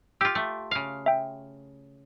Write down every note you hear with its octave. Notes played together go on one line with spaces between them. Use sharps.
F4 G4 E6
A3
C#3 F5
E5 G5